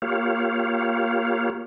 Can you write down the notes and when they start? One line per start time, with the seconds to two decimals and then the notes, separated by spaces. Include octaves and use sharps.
0.02 A#3 F4 G4 C#5 F5